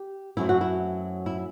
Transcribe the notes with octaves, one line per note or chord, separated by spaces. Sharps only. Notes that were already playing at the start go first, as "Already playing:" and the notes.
Already playing: G4
F#2 F#3 A3 C4 E4
F#4
E4
E4